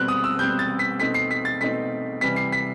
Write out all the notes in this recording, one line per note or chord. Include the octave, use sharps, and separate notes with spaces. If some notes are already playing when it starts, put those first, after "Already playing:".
Already playing: B2 G3 C4 F#6
D#6
E6
B2 G3 C4 G6
A6
B6
B2 A3 C4 D#4 B6
C7
B6
A6
B2 A3 C4 D#4 B6
C3 E3 G3 B6
C7
B6